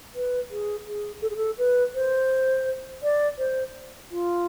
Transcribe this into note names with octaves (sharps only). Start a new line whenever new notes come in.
B4
G#4
G#4
A4
G#4
A4
B4
C5
D5
C5
F4